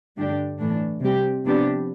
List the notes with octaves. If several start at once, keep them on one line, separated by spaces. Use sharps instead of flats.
G2 D3 A3 D4 G4
A2 E3 A3 D4
C3 G3 C4 G4
C3 F3 B3 D4 G4